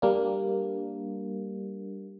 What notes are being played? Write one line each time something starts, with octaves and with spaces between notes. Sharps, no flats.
G3 A#3 D4